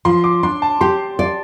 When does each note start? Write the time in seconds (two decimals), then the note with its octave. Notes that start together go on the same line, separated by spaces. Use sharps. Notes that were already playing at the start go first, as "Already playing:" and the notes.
0.05 F3 C6
0.24 D6
0.43 D4 C6
0.62 A5
0.81 G4 C6
1.19 D5